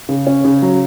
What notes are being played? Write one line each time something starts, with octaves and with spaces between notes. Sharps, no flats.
C#3
C#4
C#3
F#3